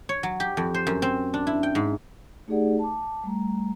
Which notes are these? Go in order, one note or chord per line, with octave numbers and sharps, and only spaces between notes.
C#5
F#3
G4
F2
C5
F#2
C4
D4
E4
G5
G#2
A3 D#4 G4 G#4 D5 F#5
A5 D6
G3 A3 A#5